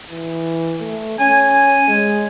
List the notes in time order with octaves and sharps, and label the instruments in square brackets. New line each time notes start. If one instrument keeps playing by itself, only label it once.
[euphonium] E3
A3
[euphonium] C#4 [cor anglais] G#5
[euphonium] G#3